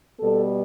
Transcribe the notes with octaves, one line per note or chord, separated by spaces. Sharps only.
B2 G3 B3 A4